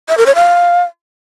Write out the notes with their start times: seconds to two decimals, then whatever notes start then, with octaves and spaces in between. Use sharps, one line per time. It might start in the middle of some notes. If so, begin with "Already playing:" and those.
0.09 E5
0.18 A#4
0.26 C#5
0.35 F5